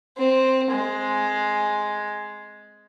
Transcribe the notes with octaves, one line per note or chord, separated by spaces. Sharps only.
C4
G#3